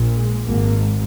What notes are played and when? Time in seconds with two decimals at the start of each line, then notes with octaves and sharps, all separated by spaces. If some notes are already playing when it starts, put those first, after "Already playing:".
Already playing: A#1 A#2
0.13 G#3
0.46 G#1 G#2 A#3